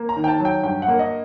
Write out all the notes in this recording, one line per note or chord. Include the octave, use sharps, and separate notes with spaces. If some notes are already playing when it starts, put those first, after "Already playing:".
Already playing: A#3
A#5
D#3
G5
A5
F#3
G5
G2 G5
F#5
A#3
D#5